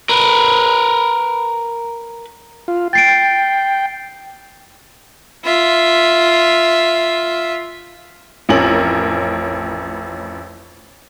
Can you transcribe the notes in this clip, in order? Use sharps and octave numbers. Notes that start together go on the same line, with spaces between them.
A#4 B4
F4
G5 A6 C7 D7
F4 E5
A1 F2 C#4 A#4 F#7